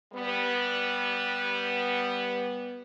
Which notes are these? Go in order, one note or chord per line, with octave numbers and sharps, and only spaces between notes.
G3 B3